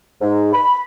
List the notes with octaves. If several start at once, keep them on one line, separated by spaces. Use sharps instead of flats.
G#2
B5